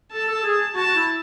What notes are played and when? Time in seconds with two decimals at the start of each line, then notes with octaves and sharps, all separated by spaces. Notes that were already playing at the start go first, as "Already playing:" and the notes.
0.12 A4 A5
0.28 A4
0.43 G#4
0.75 F#4 A5
0.86 F#4
0.95 E4